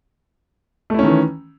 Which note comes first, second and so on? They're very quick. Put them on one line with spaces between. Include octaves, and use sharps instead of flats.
A3 E4 C#4 D#3 E3